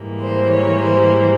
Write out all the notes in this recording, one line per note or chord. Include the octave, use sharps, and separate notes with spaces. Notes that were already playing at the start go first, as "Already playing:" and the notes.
Already playing: G#2 E3 G3 A#3
C5
C#5
C5